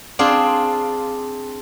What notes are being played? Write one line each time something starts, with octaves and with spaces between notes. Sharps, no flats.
C4 D4 F4 G#4